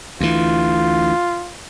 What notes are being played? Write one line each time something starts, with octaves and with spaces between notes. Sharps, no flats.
D2 E3 F4